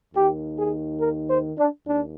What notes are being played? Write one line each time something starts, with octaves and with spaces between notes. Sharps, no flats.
D#2 D#3 G4
G#4
A#4
C5
D4
D#2 D4